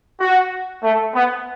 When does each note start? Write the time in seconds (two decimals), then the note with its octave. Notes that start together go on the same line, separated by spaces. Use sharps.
0.20 F#4
0.82 A3
1.13 B3